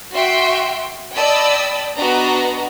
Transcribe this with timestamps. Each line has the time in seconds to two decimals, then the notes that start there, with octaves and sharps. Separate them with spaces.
0.14 F#4 E5 G5 C6
1.14 D5 D#5 G5 A5 B5 E6
1.96 B3 D4 F#4 B4 D#5 A#5